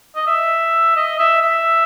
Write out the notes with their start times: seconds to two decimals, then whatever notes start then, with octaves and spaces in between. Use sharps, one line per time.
0.16 D#5
0.27 E5
0.96 D#5
1.19 E5
1.42 E5